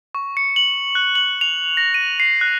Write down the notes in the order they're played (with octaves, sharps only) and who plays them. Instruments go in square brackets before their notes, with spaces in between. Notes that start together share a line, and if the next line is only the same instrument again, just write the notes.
[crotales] C#6
C#7
F#7
F#6
F#7
F7
A#6
D#7
C7
F#6